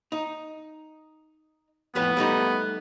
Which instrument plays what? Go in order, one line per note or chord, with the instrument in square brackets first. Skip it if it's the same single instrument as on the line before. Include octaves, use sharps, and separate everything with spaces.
[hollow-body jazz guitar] D#4
[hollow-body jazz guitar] F2 A2 B4 [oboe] B3
[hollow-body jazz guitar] G3 A3 D#4